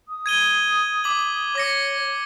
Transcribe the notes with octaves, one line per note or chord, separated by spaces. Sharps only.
D#6
G#6 D#7 G7
D6 F#7
C#5 D6 A#6 C#7